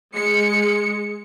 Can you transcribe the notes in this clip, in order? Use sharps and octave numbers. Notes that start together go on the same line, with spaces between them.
G#3 C#7